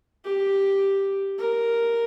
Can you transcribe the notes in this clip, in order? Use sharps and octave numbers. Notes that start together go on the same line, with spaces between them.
G4
A#4